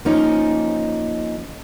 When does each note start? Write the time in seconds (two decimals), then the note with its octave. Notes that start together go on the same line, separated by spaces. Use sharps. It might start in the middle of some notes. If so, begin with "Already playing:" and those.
0.05 F3 A#3 C#4 D#4